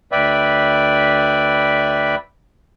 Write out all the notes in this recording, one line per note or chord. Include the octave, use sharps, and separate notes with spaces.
D2 B4 D5 E5 G5 B5